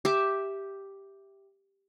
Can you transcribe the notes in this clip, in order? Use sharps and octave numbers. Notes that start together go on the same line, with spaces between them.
G4 E5 D6